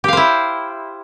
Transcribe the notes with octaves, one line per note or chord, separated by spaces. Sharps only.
E4 G4 C5 F5